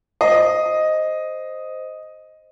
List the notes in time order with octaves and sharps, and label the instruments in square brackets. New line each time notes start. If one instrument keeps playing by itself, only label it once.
[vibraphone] C5 [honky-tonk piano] D#5